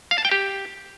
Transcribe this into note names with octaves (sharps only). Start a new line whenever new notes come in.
F5
A5
G5
G4